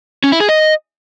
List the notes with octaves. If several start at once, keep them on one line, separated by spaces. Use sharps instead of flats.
C#4
E4
G#4
D#5